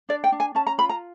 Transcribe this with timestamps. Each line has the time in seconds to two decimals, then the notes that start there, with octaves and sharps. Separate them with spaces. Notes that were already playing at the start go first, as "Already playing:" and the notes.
0.09 D4 D5
0.24 G5
0.32 D4
0.40 G#5
0.55 C#4 A5
0.67 A#5
0.78 F4 B5
0.89 A#5